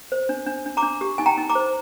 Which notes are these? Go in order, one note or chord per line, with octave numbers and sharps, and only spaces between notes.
C5
D4
D4
D4
A#5 D6
D4
G4
D#4 G#5
G5 A#5
D#4
A#5 D6
C5